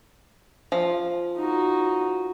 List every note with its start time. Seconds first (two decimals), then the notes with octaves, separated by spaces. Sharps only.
0.72 F3
1.37 D#4 F#4